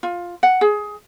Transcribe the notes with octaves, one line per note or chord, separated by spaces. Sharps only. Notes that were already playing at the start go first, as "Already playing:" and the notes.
F4
F#5
G#4